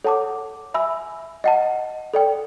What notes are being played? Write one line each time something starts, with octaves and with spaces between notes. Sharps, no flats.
A4 C#5 F#5 A5 D6
E5 G#5 B5 E6
D#5 F#5 A5
A4 D5 G5